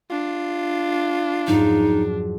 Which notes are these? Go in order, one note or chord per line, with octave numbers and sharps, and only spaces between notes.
D4 F4
F2 G#2 F#3 D#4